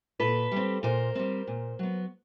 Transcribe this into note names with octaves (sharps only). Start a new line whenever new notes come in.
A#2 A4 B4
G3 C4
A#2 A#4 C5
G3 C4
A#2
F#3 B3